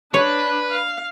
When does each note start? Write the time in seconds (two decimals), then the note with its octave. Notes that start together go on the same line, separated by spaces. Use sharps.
0.14 D4 B4 C#5
0.71 F5